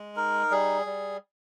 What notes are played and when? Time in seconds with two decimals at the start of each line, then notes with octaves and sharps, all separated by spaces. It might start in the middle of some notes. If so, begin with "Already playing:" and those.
Already playing: G#3
0.16 D#4 A#4
0.51 G3 G#4
0.86 G3